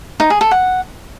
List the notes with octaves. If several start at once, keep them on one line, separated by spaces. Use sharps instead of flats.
D#4
G#4
A4
F#5